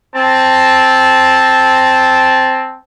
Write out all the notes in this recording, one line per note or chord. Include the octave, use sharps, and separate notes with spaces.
C4 A5